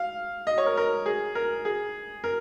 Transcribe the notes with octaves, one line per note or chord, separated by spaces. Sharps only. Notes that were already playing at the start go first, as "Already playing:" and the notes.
Already playing: F5
D#5
C#5
A#4
A#4
G#4
A#4
G#4
A#4